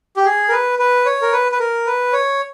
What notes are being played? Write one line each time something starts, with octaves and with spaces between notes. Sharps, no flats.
G4
G#4
A#4
B4
B4
C#5
A#4
B4
B4
A#4
B4
C#5